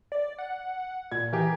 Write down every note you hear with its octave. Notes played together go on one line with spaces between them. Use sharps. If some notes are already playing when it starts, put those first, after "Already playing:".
D5
F#5
A#2 G#6
E3 G4 G#4 A#4